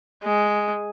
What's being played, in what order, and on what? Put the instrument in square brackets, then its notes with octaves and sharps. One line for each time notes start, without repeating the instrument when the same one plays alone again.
[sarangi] G#3